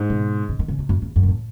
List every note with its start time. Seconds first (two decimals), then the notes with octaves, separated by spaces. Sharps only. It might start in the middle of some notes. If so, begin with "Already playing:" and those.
Already playing: G#2
0.10 B2
0.49 C#3
0.59 D#3
0.68 C#3
0.79 F#2
0.89 F#2
1.02 E2
1.16 F#2
1.23 B2
1.29 A2